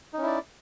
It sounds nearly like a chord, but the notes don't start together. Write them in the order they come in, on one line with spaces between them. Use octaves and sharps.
D#4 C#4 E4 D5